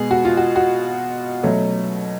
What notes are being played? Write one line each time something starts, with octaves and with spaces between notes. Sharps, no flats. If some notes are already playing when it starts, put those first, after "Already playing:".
Already playing: B2 G#3 B3 G#4
F#4
F4
F#4
F#4
B2 F#3 A3 C#4